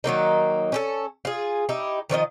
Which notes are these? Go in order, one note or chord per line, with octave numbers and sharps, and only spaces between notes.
D#3 F#3 A#3 D#4
C#4 D#4 A4
F4 G#4
D#4 E4 G4
D#3 F3 C#5 D#5